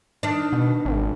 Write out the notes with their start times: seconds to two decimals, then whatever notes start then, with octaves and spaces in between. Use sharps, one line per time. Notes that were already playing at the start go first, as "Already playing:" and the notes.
0.23 D#3 D4
0.53 B2
0.85 G#1